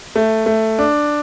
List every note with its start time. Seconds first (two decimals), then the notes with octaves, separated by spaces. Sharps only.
0.16 A3
0.46 A3
0.79 D4